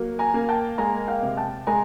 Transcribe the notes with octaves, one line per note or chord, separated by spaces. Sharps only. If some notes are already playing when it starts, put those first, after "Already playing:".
Already playing: F#3 A#3
G#5 A#5
A#3
G5 A5
G#3 G#5 A#5
F5 G5
C3
G5 A5
G#3 G#5 A#5